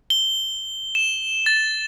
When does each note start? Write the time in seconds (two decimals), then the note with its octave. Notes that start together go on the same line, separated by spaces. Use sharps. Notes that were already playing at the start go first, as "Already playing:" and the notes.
0.10 G7
0.95 E7
1.46 A6